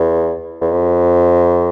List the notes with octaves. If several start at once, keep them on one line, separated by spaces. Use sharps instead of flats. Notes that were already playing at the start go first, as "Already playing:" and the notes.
Already playing: E2
E2
F2